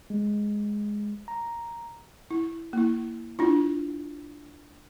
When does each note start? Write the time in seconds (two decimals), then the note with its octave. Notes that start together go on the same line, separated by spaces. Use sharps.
0.10 G#3
1.28 A#5
2.31 E4
2.73 A#3 E4
3.39 D4 E4 F4